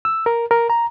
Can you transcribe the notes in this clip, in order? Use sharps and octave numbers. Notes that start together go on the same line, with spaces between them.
E6
A#4
A#4
A#5